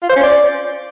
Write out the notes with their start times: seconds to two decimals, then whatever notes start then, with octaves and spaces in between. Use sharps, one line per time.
0.02 F4
0.09 C5
0.16 C#4
0.23 D5